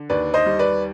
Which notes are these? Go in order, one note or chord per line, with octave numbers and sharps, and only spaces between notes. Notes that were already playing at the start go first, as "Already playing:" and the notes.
Already playing: D3
D#2 B4 D5
C5 D#5
G3
B4 D5